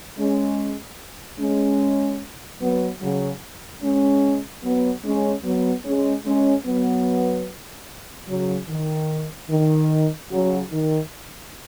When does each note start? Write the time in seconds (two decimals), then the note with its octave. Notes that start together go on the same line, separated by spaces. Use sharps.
0.18 G#3 C#4
1.40 G#3 C#4
2.61 F#3 B3
3.01 C#3 F#3
3.82 G#3 C#4
4.64 F#3 B3
5.04 G#3 C#4
5.45 F#3 B3
5.85 G#3 C#4
6.26 G#3 C#4
6.66 F#3 B3
8.28 C#3 F#3
8.69 D#3
9.50 D#3
10.31 C#3 F#3
10.71 D#3